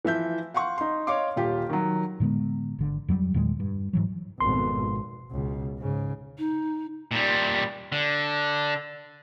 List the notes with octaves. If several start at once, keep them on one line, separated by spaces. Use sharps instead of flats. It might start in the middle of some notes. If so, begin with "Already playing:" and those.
E3 F3 E5 G6
F5 F#5 C6 C#6
D#4 C6
C#5 D#5 F5 C6 D6
D#1 F4 G4
D#3 F#3
A2 D3 G#3 B3
G#1 D3
F2 F#3 G3
E2 A#2 D#3 G#3
G2
G#2 E3 F#3
G#1 F2 B2 C6
C#2 B2
G#2 C#3
D#4
A#2 G3
D3